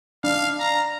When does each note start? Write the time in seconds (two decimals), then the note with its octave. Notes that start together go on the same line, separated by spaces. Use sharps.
0.24 D4 F5
0.60 A#5